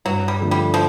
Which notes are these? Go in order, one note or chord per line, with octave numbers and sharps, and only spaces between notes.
G2 F#3
G3
D3 F3 A3 D4
G3
F3